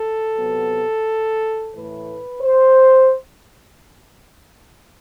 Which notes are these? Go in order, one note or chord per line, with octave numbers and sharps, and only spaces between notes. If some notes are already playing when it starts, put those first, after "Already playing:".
Already playing: A4
C3 F#3 B3
A2 E3 A3 B4
C5